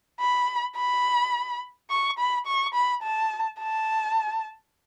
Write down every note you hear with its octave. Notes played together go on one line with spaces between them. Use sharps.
B5
B5
C#6
B5
C#6
B5
A5
A5